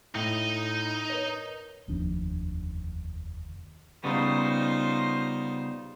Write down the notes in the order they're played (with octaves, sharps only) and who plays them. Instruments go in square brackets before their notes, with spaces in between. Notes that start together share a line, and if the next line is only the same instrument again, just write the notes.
[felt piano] A2 [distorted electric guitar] D#4 D#5
[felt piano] A#4 B4 C#5
[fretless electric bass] F1 D#2 F3 D4
[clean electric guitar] C#3 G3 B3 [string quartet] D#4 F4 C5